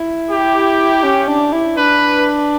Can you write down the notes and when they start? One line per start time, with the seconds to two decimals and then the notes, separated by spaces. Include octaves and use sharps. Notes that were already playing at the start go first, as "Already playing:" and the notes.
Already playing: E4
0.30 G4
1.04 C#4
1.28 D4
1.53 E4
1.77 D4 B4